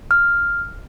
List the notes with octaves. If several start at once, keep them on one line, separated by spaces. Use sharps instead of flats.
F6